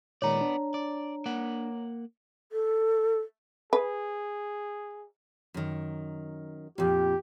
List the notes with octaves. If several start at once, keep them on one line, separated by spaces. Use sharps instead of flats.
A#2 D#3 G#3 B3 C#5 D5 A#5
D4
D5
A#3 F#5
A4
G#4 B4
F#2 D#3
F2 A#2 G4